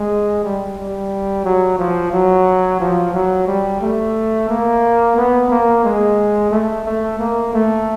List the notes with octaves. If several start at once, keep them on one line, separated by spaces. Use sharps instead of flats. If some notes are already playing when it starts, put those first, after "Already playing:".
Already playing: G#3
G3
G3
F#3
F3
F#3
F3
F#3
G3
A3
A#3
B3
A#3
G#3
A3
A3
A#3
A3